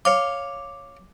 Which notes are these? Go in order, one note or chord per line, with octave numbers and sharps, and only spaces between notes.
C#5 F5 D6